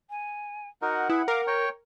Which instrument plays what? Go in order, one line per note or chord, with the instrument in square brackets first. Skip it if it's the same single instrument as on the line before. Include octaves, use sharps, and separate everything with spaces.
[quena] G#5
[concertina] D#4 F#4 A#4 [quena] F#5
[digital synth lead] E4 [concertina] G#4 B4
[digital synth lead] A#4 [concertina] F5 D6
[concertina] C#5 G5 C#6